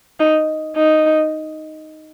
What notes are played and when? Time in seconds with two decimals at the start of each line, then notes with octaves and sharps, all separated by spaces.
0.20 D#4
0.77 D#4